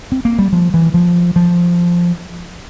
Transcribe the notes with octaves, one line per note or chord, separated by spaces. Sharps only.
C4
A#3
G3
F3
E3
F3
F3